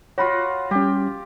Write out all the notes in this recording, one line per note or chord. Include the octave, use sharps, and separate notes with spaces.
F4 F#4 C#5 B5
G3 C#4 G4